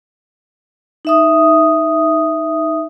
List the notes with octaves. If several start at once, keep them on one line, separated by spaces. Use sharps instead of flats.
D#4 E5 D#6